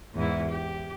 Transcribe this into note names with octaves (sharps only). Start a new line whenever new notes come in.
E2 G#2 E4
G4